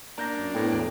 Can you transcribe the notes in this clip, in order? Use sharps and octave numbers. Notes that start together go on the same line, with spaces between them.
A#3 D4 A#5 G6 A#6
F#2
A2 B3 G5
E1 G5 D7